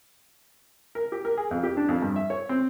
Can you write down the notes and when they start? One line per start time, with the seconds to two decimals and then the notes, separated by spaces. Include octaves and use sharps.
0.95 A#4
1.12 G4
1.25 A#4
1.37 G#4
1.51 F2
1.63 G4
1.77 D4
1.88 F2
2.02 G2
2.16 E5
2.30 C#5
2.49 C4